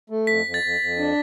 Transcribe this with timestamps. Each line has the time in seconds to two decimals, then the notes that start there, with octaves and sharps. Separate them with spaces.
0.10 A3
0.27 F2 B6
0.45 F2
0.54 A6
0.63 F2
0.80 F2
0.98 D4